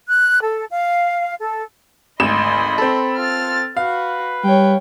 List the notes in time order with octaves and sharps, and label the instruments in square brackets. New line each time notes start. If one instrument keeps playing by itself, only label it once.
[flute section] F#6
A4
F5
A4
[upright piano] G#1 D2 E7 [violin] D#5 C6 [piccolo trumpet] B5
[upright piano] C4 A4
[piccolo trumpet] F4 [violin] F6 A6
[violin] F#4 [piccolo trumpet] B4 [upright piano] F5
[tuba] G3 [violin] C#5 G5